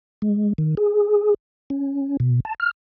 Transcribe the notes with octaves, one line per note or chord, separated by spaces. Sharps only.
G#3
D#3
G#4
C#4
B2
A5
F6